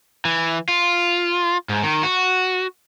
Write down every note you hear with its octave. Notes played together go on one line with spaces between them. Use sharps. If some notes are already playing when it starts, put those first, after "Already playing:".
E3
F4
G#2
D#3
F#4